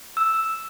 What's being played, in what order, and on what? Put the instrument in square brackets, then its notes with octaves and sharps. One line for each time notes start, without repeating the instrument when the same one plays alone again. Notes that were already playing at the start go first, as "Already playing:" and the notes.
[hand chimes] E6